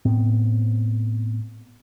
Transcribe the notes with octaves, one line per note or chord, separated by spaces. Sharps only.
A2 B3 C4